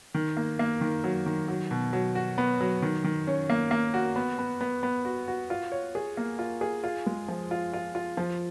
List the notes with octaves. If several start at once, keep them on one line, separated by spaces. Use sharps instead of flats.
D#3
A#3
A#3
D#3
F#3
D#3
F#3
B2
F#3
F#4
B3
F#3
D#3
D#3
C#4
A#3
A#3
F#4
B3
B3
B3
B3
F#4
F#4
F4
C#5
G#4
A#3
F4
G#4
F4
G#3
F3
F4
F4
F4
F3